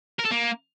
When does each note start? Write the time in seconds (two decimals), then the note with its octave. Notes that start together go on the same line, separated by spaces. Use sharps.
0.19 A#4
0.25 A4
0.31 A#3